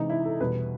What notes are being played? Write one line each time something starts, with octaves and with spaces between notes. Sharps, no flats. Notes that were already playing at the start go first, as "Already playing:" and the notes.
Already playing: C3 E3 G#3 D#4
E4
A4
E2 B2 G3 B4